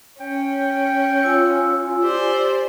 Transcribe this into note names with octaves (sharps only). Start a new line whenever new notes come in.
C#4 G5
F4 G#5 E6
G4 C5 D5